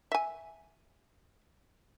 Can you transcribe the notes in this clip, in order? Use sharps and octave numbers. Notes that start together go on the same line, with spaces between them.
E5 G#5